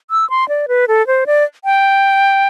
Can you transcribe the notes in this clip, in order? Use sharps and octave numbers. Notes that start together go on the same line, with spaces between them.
E6
C6
D5
B4
A4
C5
D5
G5